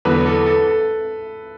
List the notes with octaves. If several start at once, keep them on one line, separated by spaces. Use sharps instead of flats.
E2 D3 F#3 B3 B4
A4
A4
A4